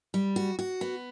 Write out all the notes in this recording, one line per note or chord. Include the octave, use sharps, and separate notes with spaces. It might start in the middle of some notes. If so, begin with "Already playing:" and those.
G3
F#4
F#4
B3